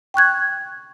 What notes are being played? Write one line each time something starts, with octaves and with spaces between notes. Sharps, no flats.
G5 C#6 F#6 G#6